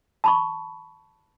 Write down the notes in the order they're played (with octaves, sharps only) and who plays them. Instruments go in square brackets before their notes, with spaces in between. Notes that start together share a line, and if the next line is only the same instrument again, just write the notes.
[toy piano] A5 B5 C#6